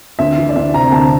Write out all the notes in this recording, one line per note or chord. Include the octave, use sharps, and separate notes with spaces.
D2 E5
E3
D5
D2 E5
C3 A#5
D2 A5